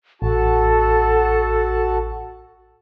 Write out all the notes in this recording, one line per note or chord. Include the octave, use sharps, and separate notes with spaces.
A1 F#4 A4 A5